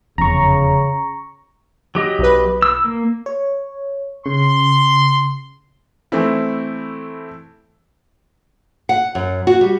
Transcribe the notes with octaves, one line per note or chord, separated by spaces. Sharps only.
F1 E2 C#3 A#5 C#6
F#3 G4 D#5
B1 B4
E6
A#3
C#5
C#3 C6
E3 A3 C4 E4
F#5
F#2
F#4
G3